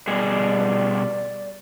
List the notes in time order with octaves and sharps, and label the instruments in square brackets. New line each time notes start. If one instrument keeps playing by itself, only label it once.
[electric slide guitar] B2 G3 G#4 [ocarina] D5